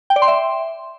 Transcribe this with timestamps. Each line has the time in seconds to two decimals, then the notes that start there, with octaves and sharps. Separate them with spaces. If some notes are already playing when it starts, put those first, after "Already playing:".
0.10 G5
0.16 D5
0.22 C6
0.28 E5